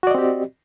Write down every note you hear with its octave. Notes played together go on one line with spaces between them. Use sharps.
C4 F#4 G4 D5 D#5